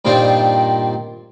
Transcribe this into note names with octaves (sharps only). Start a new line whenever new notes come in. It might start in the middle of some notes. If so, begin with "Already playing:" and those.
G2 A#2 D#3 C4 D4